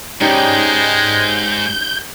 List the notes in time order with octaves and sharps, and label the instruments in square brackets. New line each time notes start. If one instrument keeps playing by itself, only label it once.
[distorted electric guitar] G#2 [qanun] G3 C#4 D#4 [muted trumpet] G#3 [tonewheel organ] G6